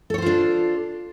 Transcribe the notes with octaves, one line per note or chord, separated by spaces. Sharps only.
D4 F4 A4 C5 C#5